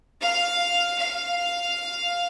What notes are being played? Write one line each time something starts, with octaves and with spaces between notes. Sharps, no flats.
F5
F5